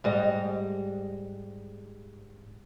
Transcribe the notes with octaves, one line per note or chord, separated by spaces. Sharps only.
G#2 G3 D#5